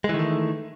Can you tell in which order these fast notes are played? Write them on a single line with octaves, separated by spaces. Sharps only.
G#3 E3 D#3 A3